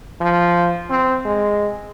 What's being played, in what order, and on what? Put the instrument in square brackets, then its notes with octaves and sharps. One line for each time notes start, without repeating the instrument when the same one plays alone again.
[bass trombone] F3
C4
G#3